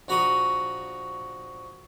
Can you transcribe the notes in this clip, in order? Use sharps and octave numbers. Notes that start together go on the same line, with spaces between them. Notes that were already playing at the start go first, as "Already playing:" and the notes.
A#1 F#4 A#5 B5 C#6 D#6